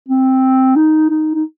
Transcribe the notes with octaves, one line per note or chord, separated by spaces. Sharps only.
C4
D#4
D#4
D#4